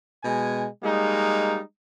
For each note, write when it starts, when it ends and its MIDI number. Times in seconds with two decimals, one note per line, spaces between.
0.24 0.67 47
0.24 0.67 56
0.24 0.67 80
0.84 1.61 55
0.84 1.61 56
0.84 1.61 58
0.84 1.61 63